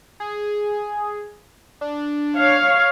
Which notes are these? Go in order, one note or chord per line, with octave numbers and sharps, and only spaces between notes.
G#4
D4
C#5 F5